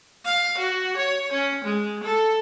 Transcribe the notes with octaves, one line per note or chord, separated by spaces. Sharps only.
F5
F#4
C#5
C#4
G#3
A4